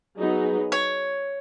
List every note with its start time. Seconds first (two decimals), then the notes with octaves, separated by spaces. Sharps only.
0.19 F#3 B3 D#4 G#4
0.72 C#5